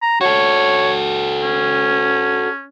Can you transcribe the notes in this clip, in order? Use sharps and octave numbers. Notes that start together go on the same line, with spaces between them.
A#5
F#4 A4 C#5
C#4